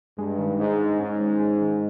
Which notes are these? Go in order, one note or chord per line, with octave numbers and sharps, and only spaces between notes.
G2 G#3
D#3
G#2 G#3
G#3
G#2 C#4
G#3
G#3
D#3